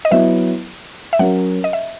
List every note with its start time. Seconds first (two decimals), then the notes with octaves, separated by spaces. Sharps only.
0.05 D#5
0.11 F#3 B3 E4 B4 E5
1.13 E5
1.19 F#3 C#4 F#4 A#4 F#5
1.64 D#5
1.73 E5